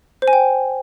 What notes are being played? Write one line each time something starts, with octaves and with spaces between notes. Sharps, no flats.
C5
G#5
G5